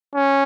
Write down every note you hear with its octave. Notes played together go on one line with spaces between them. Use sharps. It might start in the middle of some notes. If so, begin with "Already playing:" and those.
C#4